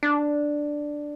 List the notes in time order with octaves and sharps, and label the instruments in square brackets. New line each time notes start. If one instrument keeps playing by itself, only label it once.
[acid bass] D4